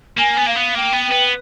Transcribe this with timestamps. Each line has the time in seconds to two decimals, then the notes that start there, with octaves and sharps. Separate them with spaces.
0.17 A#3 G#5
0.37 B3
0.45 A#3 F5
0.56 B3
0.74 A#3 G5
0.93 B3
1.02 B4
1.11 B3